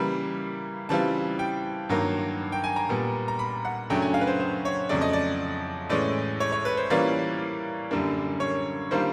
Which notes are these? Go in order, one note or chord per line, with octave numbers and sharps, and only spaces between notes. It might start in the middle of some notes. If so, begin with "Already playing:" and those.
Already playing: C#3 E3 G3 A#3 B5
C#3 E3 G3 C4 F4 A5
G5
G2 D#3 F#3 A#3
G5
G#5
A#5
A#2 G3 B3
A#5
B5
F#5
F#2 C#3 F#3 A3 D4 G5
G#5
F5
B4
C5
C5
C#5
F2 C#3 F#3 A3 D5
D#5
D5
A2 E3 G#3 C#4 D5
C#5
C#5
B4
C5
E3 G3 A#3 C#4 F4 D5
F#2 D3 G3 A#3 D4
C#5
D#3 G3 A#3 D4 F4 C5